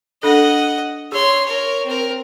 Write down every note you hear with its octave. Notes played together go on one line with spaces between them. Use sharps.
D4 A4 D#5 F#5
G#4 C#5 C6
A#4 C#5
C4 A#4